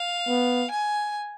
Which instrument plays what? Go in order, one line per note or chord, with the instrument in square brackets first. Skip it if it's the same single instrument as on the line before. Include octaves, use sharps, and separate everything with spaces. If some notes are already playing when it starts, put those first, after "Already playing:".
Already playing: [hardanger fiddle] F5
[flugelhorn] B3
[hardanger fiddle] G#5